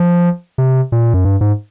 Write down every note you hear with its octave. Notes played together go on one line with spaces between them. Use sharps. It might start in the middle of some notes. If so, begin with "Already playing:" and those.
Already playing: F3
C3
A#2
F#2
G2
G#2